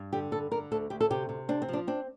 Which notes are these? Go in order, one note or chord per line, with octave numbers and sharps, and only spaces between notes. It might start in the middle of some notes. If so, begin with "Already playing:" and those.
Already playing: G2
D3 G4
G2 A4
D3 A#4
D2 A4
D2 G4
A4
C3 G4
C3
C4 D4
C4
F3
D4
C4 D4